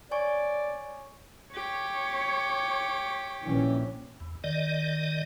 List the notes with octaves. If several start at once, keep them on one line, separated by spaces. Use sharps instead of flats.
C#5 D5 G#5 C#6
G4 C#5
A#1 E3 C#4
E2
D#3 D5 D#5